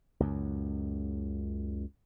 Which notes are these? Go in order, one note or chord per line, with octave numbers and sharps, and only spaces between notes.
C#2 F#2